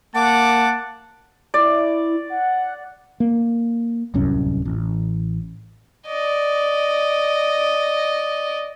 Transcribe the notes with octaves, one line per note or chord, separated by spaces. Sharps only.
A#3 F#5 A5 D6
E4 D5
F#5
A#3
D1 C2 F#2 C#4
A1
D5 D#5